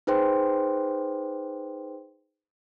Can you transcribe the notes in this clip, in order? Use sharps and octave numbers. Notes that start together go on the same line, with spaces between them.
D#4 G#4 B4 C5 G5 C6